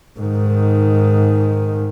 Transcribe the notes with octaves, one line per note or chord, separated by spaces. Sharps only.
G#2 D#3